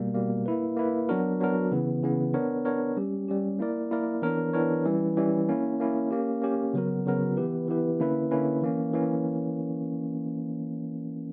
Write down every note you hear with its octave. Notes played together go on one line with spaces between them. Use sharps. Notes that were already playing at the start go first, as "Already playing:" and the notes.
Already playing: B2 G3 A#3
B2 G3 A#3
A#3 E4 B4
A#3 E4 B4
F#3 B3 D4 F#4 A#4
F#3 B3 D4 F#4 A#4
C#3 E3 B3
C#3 E3 B3
B3 D4 A#4 C#5
B3 D4 A#4 C#5
G3 C#4 G4
G3 C#4 G4
A#3 E4 A#4 D5
A#3 E4 A#4 D5
E3 B3 D4 A#4 C#5
E3 B3 D4 A#4 C#5
E3 G3 C#4
E3 G3 C#4
A#3 C#4 E4
A#3 C#4 E4
A#3 C#4 G4
A#3 C#4 G4
C#3 F#3 B3 F#4 A#4
C#3 F#3 B3 F#4 A#4
E3 B3 E4 G4 B4
E3 B3 E4 G4 B4
D3 A#3 C#4 E4 B4
D3 A#3 C#4 E4 B4
E3 A#3 C#4
E3 A#3 C#4